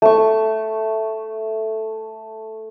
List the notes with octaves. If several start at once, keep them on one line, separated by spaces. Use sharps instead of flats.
A3 C#6